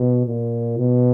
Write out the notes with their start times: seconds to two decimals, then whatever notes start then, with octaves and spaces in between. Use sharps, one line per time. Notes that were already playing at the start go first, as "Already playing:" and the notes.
Already playing: B2
0.27 A#2
0.78 B2